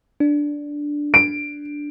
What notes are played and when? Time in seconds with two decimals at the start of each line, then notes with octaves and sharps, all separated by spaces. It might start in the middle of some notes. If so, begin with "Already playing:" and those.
0.20 D4
1.14 D7